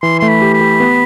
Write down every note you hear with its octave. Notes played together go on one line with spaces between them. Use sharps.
E3 C6
A3 C6
B5
G4
B5
G4
B3